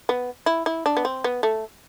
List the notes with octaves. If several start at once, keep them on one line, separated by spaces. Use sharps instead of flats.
B3
E4
E4
D4
B3
C4
B3
A3